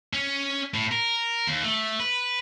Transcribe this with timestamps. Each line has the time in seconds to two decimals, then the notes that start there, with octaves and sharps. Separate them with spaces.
0.13 C#4
0.74 A2
0.92 A#4
1.47 D#2
1.63 A3
2.00 B4